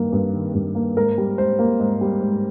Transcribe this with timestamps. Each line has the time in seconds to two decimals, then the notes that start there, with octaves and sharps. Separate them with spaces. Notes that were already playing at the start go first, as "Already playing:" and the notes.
Already playing: G2 D#3 A#3
0.13 G2
0.33 D#3
0.54 G2
0.75 A#3
0.96 G#2 A#4
1.18 G3
1.38 G#2 C5
1.59 A#3
1.80 G#2
2.01 G3
2.22 G#2